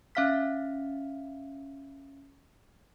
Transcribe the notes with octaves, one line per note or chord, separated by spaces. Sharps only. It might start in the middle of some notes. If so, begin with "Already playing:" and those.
C#4 E5 F5 F6 B6